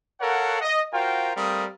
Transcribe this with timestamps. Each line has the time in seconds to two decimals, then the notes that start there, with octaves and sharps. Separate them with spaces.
0.20 A4 A#4 C#5 F5 F#5
0.61 D#5
0.93 F4 F#4 A#4 C5 F5 G5
1.36 G3 A3 C4 A#4 F5 D#6